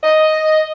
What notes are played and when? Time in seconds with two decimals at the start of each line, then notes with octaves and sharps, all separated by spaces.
0.03 D#5